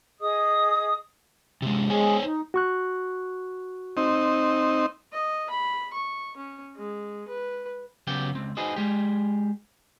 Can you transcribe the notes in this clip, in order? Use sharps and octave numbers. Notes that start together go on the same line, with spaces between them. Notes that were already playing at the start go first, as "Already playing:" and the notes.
G#4 D#5 D#6
C3 G#3
G#3 G#4 C5 C#5 G#5
D#4
F#4 C#6 F#6
C4 D#4
D#5
B5
C#6
C#4
G#3
B4
C#3 F#3 B3 F#4 G4 G5
C#2 C4
D#4 F#4 G#4 B4 C5 D#5
G#3 G4